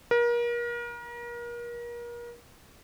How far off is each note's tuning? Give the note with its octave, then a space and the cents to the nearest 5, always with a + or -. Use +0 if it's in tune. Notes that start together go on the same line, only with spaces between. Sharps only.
A#4 +35